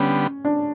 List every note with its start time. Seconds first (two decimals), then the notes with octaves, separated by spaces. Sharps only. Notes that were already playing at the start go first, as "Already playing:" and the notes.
Already playing: D3 G3 B3 C#4
0.45 D4